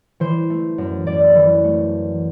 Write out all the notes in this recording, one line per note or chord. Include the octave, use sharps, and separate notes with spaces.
E3 C5
A3
F#2
F#2 D5
E3
A3